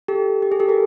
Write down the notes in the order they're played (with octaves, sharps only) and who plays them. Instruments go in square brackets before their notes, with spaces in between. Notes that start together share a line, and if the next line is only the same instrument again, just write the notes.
[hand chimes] G4 A4
G4
G#4
G4 A4
G#4 A#4